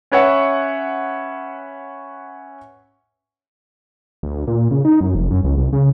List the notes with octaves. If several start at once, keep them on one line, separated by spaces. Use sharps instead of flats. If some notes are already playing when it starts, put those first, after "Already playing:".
C#4 B4 C#5 E5 F#5
D2
A#2
C#3
D#4
F#2
F1
F#2
C#2
C2
C#3